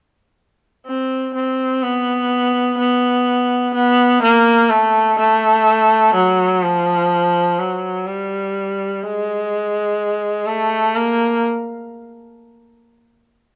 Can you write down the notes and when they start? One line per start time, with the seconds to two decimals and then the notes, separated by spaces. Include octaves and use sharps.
0.86 C4
1.34 C4
1.82 B3
2.78 B3
3.74 B3
4.23 A#3
4.70 A3
5.18 A3
6.14 F#3
6.63 F3
7.59 F#3
8.07 G3
9.03 G#3
10.47 A3
10.95 A#3